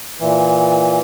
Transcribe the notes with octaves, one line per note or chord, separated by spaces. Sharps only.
A#2 E3